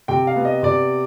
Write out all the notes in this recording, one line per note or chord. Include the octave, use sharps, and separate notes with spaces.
C3 G5
F5
B3
D#5
C3 D5